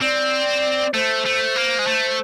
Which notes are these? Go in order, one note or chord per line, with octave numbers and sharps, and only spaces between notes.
C4 D5
A3 C5
A3
A#3
G#3
A3